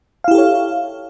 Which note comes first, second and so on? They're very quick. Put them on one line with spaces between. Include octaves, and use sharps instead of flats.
F5 E4 G4 A4 C#5